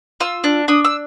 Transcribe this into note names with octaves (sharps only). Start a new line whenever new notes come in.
F4 E6
D4
D4 D#6
E6